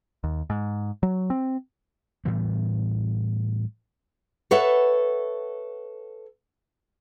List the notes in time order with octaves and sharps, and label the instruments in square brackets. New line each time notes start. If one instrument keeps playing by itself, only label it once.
[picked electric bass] D#2
G#2
F#3
C4
[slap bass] A2 E3 G3 B3
[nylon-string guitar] A4 B4 C#5 E5 F#5